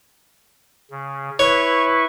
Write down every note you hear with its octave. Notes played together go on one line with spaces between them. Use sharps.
C#3
E4 B4 C#5 C#6